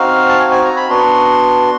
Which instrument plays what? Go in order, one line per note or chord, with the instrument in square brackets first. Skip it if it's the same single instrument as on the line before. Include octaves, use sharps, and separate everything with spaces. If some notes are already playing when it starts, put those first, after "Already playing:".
Already playing: [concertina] C4 D#4 F#4 F5
A5
G#5
G#5
A#5
B5
B3 D4 F#4 C6